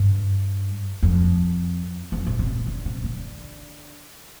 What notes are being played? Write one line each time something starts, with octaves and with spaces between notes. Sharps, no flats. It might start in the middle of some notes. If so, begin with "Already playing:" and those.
Already playing: G2
F2
F2
A2
C3
D3
C3
D3